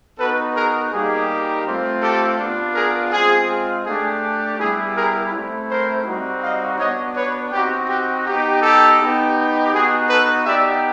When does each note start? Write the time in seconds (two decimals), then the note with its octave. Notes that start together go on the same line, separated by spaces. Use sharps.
0.18 B3 D#4 F#4 A4 B4
0.54 G#4 A#4
0.91 G3 A#3 D#4 G4 G#4
1.65 A3 C4 F4
2.01 G4 A4
2.38 B3 D4 F4
2.75 G#4 A#4
3.11 G#3 C4 F4 G#4
3.85 A3 D4 G4 G#4
4.59 G3 B3 E4 G4 G#4
4.95 G#4 A#4
5.32 A3 C4 E4
5.68 A#4 C5
6.05 G3 C4 D#4 F#4
6.42 D#5 F5
6.78 B3 D4 F#4 C#5 D#5
7.15 B4 C#5
7.52 C4 D#4 F#4 G4
7.88 G4
8.26 B3 D#4 G4
8.62 G4 A4
8.99 B3 D#4 G4
9.72 B3 D#4 F#4 G#4
10.09 A4 B4
10.45 B3 D#4 G4 D5 E5